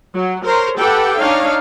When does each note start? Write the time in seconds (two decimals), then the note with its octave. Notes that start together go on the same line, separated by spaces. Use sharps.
0.13 F#3
0.44 A#4 C5 C#5
0.79 G4 A4 B4 F#5 G5
1.18 D4 D#4 C#5 F5